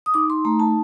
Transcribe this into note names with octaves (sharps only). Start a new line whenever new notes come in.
D#6
D#4 D6
C6
A3 A#5
A5